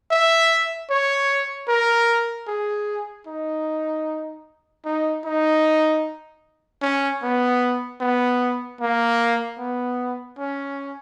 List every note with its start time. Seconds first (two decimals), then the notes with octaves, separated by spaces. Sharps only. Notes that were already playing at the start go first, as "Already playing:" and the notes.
0.11 E5
0.90 C#5
1.68 A#4
2.48 G#4
3.27 D#4
4.85 D#4
5.25 D#4
6.82 C#4
7.22 B3
8.01 B3
8.81 A#3
9.58 B3
10.39 C#4